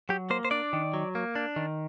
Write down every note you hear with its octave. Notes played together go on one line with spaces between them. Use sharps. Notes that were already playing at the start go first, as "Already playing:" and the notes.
F#3 G4
A#3 C5
C5
D4 D5
D#3
F#3
A#3
D4
D#3